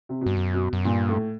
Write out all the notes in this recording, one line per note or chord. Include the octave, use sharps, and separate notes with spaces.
C3
G2 B2
F#2
B2
F#2
G2 A#2
A2